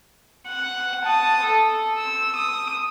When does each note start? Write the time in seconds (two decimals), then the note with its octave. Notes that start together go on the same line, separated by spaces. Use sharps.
0.47 F#5
1.05 A5 D#6
1.43 A4
1.98 E6
2.36 D#6